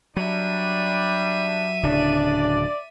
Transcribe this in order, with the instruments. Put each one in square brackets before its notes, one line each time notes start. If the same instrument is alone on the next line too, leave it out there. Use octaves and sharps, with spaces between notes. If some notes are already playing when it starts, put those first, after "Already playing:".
[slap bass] F#3 [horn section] G3 D4 [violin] E5 D#7
[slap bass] D1 C#3 [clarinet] D4 [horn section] D5